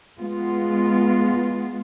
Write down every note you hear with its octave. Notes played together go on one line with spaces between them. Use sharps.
G#3 B3 F4